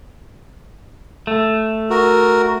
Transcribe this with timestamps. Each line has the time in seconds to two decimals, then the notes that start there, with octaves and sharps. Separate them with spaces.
1.27 A3
1.90 F#4 A#4